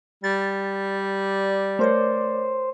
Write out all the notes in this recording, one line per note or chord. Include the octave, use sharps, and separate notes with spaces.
G3 A6
D5
A3 A#4 C5 C#5